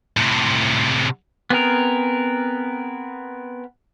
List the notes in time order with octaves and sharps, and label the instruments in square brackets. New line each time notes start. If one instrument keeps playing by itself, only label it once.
[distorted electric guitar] A2 C3
[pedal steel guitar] B3 C4 G#4 A#4